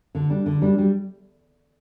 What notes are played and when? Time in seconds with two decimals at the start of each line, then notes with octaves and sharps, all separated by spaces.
0.15 D3
0.30 G3 D4
0.46 D3
0.61 G3 D4
0.78 G3